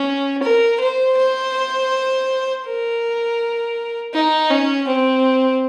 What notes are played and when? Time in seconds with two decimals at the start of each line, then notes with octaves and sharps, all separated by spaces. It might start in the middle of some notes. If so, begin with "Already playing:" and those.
Already playing: C#4
0.43 A#4
0.80 C5
1.17 C5
2.66 A#4
4.14 D#4
4.51 C#4
4.88 C4